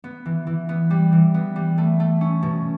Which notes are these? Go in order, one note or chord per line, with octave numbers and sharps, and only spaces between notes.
B3
E3
E3
B3
G3
E3
B3
G3
A3
A3
C#4
B2